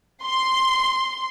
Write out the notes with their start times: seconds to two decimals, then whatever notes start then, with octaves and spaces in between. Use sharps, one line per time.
0.24 C6